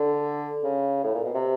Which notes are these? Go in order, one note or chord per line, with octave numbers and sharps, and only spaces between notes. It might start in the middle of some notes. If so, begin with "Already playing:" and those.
Already playing: D3
C#3
A2
A#2
B2
C3